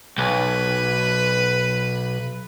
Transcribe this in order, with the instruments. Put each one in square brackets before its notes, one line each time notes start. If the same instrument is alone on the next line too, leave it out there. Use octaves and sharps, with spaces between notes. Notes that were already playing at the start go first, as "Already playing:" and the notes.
[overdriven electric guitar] B1 [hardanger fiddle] B4